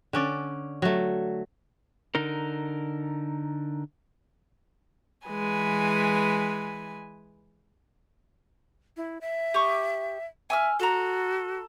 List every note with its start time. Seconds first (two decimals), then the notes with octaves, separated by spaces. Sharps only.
0.13 D3 C#4 D5
0.82 F#3 A3
2.15 D3 D#4 A#4
5.27 E3 G#3 B4 G#5
8.97 E4
9.21 E5
9.54 G4 C#6 D#6
10.50 E5 G#5 E6 F6
10.80 F#4 A4 A#5